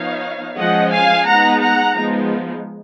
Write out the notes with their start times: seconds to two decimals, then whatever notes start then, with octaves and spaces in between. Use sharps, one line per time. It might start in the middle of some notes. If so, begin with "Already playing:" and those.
Already playing: F3 B3 D#4 C#5 F5
0.57 F3 G#3 C#4 D#5 F#5
0.92 F5 G#5
1.26 G#3 B3 D#4 F#5 A#5
1.61 F#5 A#5
1.95 F3 G#3 B3 D#4